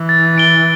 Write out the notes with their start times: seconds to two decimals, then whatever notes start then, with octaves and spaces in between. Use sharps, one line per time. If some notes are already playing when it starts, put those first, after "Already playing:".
Already playing: E3
0.09 A6
0.38 D7 G7